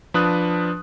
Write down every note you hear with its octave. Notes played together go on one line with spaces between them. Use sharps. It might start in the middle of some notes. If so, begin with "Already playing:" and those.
F3 D4 B4 D#6 F#6